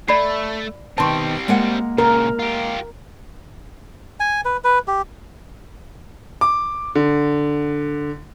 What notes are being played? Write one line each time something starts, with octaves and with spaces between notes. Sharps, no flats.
A3 D5 B5 C7
B2 D#3 G3 C4 A5 C6 C#6
G#3 A#3 F#5
A#2 C#3 A#4
F4 G4
G#5
B4
B4
G4
D6
D3